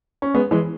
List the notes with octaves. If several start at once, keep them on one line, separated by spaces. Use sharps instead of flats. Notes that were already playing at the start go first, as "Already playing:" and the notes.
C#4
G#3 B3
E3 G#3